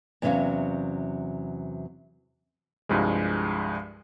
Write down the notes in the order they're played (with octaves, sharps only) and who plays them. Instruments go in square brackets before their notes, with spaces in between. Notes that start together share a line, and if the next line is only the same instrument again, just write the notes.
[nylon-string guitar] E2 C3 F#3 C#4 E5 F5
[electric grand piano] C2 G2 F3 G#3